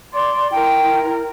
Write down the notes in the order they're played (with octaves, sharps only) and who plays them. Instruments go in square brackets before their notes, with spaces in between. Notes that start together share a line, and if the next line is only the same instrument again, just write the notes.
[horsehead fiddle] D5 [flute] C6
[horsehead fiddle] E4 A#4 [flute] G5